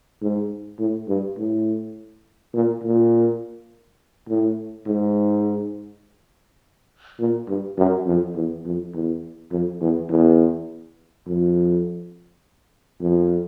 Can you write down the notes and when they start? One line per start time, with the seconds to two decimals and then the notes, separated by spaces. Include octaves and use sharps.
0.22 G#2
0.79 A2
1.09 G2
1.38 A2
2.54 A#2
2.84 A#2
4.29 A2
4.87 G#2
7.20 A#2
7.48 G2
7.78 F#2
8.06 F2
8.36 E2
8.66 F2
8.94 E2
9.52 F2
9.81 E2
10.10 E2
11.27 F2
13.02 F2